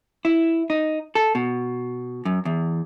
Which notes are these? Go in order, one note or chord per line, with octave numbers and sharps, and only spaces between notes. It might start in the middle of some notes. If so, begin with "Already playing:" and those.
E4
D#4
A4
B2
F#2
E2